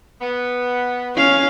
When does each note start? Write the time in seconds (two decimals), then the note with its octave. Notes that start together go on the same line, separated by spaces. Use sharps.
0.21 B3
1.17 C#4 F5